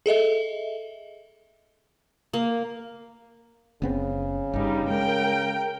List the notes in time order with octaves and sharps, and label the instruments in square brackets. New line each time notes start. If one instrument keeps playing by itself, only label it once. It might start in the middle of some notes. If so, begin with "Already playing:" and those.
[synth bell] G#4 A4 D#5 E5
[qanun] A#3
[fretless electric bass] F#1 B3 C4 [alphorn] C#3
[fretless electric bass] G1 G2 [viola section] G3 D#4
[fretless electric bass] G#3 [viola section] A#4 G5